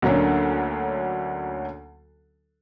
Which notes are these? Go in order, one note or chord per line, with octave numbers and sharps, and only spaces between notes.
D2 D3 F#3 A#3 C#4 D4